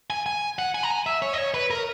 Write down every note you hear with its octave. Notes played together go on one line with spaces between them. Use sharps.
G#5
G#5
F#5
G#5
A#5
G#5
E5
C#5
D#5
C#5
B4
A#4